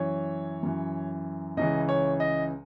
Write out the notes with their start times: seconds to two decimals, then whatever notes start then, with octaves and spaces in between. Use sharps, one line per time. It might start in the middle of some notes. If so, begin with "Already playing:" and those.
Already playing: F#2 E3 C#5
0.63 F#2 E3
1.57 C#2 C#3 E3 D#5
1.89 C#5
2.20 D#5